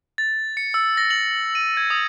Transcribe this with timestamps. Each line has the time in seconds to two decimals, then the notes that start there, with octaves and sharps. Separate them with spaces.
0.18 A6
0.57 C#7
0.74 E6
0.97 A#6
1.10 F#7
1.55 D#7
1.77 G#6
1.90 D#6